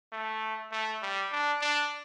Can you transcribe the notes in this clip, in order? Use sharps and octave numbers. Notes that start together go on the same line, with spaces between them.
A3
A3
G3
D4
D4